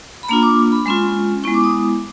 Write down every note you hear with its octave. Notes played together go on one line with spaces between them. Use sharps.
B5
A#3 D4 F4 A#5
D6
B5
G#3 C#4 F4 C6
G#3 B3 E4 C#6
D6
D#6